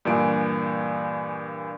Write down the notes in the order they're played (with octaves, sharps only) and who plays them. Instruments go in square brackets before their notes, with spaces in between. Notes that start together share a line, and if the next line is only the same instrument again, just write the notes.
[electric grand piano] G2 A#2 E3 G#5 D7